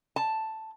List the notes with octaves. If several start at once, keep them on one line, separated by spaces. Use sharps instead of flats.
A5